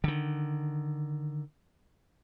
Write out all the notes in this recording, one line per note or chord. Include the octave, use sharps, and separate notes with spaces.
D3 D#3